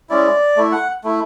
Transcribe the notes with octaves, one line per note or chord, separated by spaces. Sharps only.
G#3 C#4 E4 D5
A3 E4
F#5
A3 E4